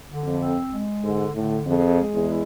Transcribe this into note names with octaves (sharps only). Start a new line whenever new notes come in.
D3
F2
C4
G#3
G#2 D3
A2 D3
F2 G#4
G#3
E2
E4